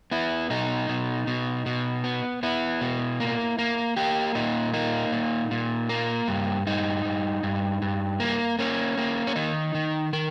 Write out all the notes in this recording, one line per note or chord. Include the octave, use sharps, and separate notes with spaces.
B3 E4
B2 D#4
B2
B2
B2
B3
B3 E4
B2
A#3
A#3
A#3 G4
A#2 D#4
A#3 D#4
A#2
A#2
A#3
G2
G2 D#4
G2
G2
G2
A#3
A#3 C#4
A#3
C#4
D#3 D#4
D#3
D#3 A#4